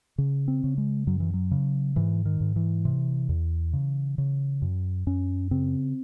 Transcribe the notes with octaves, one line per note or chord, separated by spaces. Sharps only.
C#3
C4
C#3
G#3
F#2 F#3
E3
F#3
C#3
G#2 E3
D#3
G#2
E3
C3
E2
C#3
C#3
F#2
F#2 C#4
C#3 C4